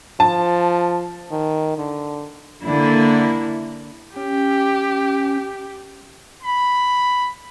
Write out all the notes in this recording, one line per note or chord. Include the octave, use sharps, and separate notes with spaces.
F3 A5
D#3
D3
D3 A#3 E4
C#4 G4
B5